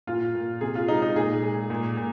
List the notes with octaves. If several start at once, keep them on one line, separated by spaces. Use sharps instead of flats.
A#2 F4
A#2
C3 G#4
F4
G#3 D#4
D#4
A#2 G#4
G#3
A#2
A#2